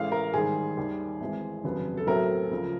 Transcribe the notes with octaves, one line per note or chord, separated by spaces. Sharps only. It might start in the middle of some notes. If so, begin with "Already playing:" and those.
Already playing: A1 A2 E3 G#3 F5
A#4
G#2 D#3 G3 G#4
D#2 D#3 G3
G#1 G#2 E3 G#3
F1 D#2 C#3 F#3 B3
A4
B1 A2 F#3 A3 C4 A#4
C#2 C#3 F3